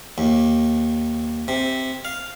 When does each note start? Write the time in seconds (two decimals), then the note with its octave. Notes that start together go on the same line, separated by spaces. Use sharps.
0.18 D#2
1.48 C3
2.05 F5